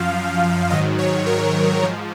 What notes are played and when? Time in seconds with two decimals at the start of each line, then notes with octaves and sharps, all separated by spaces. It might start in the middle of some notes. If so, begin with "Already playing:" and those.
Already playing: F#2 F3 F5
0.70 G#2 D#3 F#3 D#5
0.98 C#5
1.26 A#4
1.83 G#2 F3